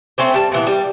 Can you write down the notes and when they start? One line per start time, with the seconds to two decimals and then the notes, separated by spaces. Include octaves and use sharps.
0.18 A3 C4 C#4 C5
0.34 G3 A5
0.52 A#2 E3 B3
0.67 G3